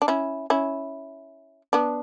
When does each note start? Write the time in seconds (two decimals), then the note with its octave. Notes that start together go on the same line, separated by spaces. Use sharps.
0.02 D4
0.08 C#4 E4
0.50 C#4 E4
1.73 B3 D4